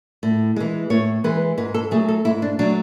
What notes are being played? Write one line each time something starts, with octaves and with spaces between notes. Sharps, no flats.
A2
E3 G#3
A2 C#5
E3 G#3 B4
G#2 B4
A4
F#3 A3 G#4
A4
G#2 E4
D4
F#3 A3 D4